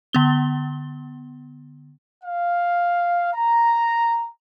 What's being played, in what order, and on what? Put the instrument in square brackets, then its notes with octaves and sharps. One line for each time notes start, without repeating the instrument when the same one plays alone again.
[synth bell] D3 B3 G7
[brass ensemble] F5
A#5